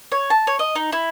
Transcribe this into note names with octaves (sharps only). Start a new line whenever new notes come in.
C#5
A5
C#5
D#5
D#4
E4